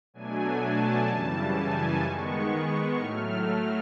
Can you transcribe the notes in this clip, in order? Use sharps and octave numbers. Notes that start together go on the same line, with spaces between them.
B2 F#3 A3 D4 G#5
A5
F#2 C#3 E3 G3
G#5
D#3 G#3 B3 C#6
A2 F#3 A3 F6